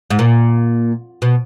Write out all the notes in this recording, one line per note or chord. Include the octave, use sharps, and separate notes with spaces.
G#2
A#2
B2